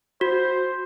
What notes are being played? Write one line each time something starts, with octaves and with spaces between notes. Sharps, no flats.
F#4 C5